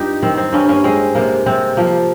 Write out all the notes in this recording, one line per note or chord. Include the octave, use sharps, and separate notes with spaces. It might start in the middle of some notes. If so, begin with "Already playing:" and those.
Already playing: G2 D#4 F4 G4
D#3 C4
C4
G2 A#3 C#4
A#3 C#4
G#3 C4
C3 A#3
C3 C4
F3 A#3